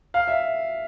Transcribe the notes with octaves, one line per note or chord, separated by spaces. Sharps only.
F5
E5